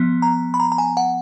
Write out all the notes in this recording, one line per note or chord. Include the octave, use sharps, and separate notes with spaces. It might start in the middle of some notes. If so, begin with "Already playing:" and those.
Already playing: F3 B3
A#5
B5
A#5
A#5
G#5
F#5